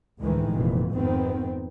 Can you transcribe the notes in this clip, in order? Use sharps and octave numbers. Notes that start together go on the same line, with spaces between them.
D2 A2 D#3 E3 G#3
F1 A#2 E3
F1 G#2 D#3 B3 C4